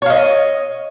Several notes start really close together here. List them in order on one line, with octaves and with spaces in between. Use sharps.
C#5 F5 D#5